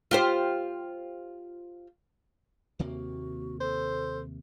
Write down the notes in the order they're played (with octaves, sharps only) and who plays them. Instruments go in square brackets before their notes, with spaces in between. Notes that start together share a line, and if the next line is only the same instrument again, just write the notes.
[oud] F4 G4 C5
[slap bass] D#2 C3 A#3 [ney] F#4
[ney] A4 [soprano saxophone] C5